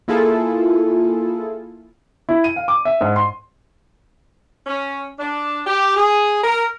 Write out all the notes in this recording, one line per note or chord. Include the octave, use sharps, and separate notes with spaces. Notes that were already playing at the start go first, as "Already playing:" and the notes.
A#3 E4 F4 G#4 A4
E4
D#7
F5
D6
E5
G#2
C6
C#4
D4
G4
G#4
A#4